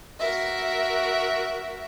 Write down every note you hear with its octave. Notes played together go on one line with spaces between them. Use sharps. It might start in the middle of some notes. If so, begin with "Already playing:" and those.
F#4 A#4 E5